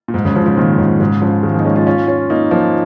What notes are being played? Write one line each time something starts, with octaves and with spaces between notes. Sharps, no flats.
A#2
G#2
G#2 C#3
C#3 F3
C#3 F3
A#2 D#3
G#2 C#3
G#2 C#3
C#3 F3
D#3 G#3
F3 A#3
D#4
G#3 C#4
C#4 F4
C#4 F4
C#4 F4
A#3 D#4
F3 A#3